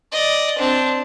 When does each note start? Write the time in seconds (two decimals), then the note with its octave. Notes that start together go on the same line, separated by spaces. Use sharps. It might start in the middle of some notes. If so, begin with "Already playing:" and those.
0.12 D5 D#5
0.59 C4 D4